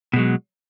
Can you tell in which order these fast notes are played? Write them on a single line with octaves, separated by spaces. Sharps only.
B2 G#3 F#3